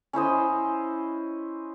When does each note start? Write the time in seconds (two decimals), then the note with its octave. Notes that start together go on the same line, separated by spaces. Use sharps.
0.13 C#4 E4 C5 D#5